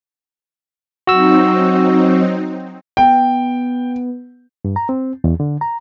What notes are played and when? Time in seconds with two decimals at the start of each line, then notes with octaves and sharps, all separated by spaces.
1.07 F#3 C4 D#4 F#4 E6
2.97 B3 G5
4.65 G2
4.76 A#5
4.89 C4
5.24 E2
5.40 D3
5.61 A#5